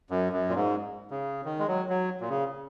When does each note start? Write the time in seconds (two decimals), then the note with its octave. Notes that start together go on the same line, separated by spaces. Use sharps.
0.10 F#2
0.33 F#2
0.49 A#2
0.55 G#2
1.11 C#3
1.45 D#3
1.59 G#3
1.67 F#3
1.89 F#3
2.21 A#2
2.29 C#3